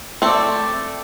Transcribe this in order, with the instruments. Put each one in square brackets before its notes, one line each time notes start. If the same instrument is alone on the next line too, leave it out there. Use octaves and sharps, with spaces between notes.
[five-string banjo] A3 C4 [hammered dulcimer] A4 D5